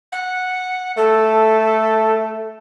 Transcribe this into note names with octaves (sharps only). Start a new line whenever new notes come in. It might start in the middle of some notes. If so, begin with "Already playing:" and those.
F#5
A3 A4